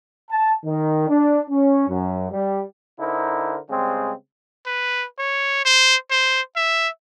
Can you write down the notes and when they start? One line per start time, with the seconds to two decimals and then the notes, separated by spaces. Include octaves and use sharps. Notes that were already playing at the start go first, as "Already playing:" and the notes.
0.31 A5
0.66 D#3
1.09 D4
1.50 C#4
1.89 F#2
2.32 G3
3.00 D3 D#4 E4 A#4 C5
3.70 C#3 G3 G#3 C4
4.66 B4
5.19 C#5
5.65 C5
6.11 C5
6.56 E5